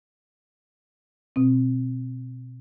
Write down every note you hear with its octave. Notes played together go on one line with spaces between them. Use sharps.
B2 C4